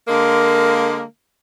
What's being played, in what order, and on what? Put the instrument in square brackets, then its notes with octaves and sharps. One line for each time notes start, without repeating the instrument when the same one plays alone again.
[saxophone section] D3 G#3 A#3